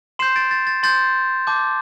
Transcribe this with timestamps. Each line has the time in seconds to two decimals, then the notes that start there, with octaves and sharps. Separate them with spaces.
0.19 C6 C7 E7
0.22 G6
0.36 A6 D7
0.51 A6
0.67 A6
0.83 C6 G6 A6
1.47 A5 D6 G6